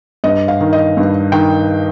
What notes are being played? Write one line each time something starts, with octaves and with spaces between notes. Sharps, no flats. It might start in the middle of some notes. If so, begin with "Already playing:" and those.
G2 D#5
F5
D#3
D#5
G2
D#3 G5